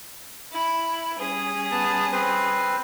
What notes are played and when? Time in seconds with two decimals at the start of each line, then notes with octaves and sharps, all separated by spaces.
0.51 E4
1.17 G3 C#4 G#4
1.71 B3 A5
2.12 C4 B4 C5